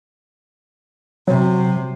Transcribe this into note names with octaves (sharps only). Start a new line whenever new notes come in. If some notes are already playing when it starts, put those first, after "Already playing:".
C3 F#3